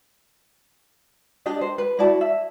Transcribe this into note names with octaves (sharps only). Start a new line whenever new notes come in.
D4 G4 D#5
C5
B4
E4 F#4 D5 A5
E5